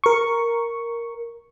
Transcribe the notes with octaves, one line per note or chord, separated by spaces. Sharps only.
A#4 C#6